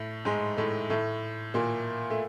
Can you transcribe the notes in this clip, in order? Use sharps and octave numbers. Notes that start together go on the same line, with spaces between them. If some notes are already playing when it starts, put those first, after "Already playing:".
Already playing: A2 A3
G#2 G#3
A2 A3
A2 A3
A#2 A#3
A3